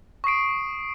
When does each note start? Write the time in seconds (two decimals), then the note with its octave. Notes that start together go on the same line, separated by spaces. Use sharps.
0.24 C#6 D#6 C7 D7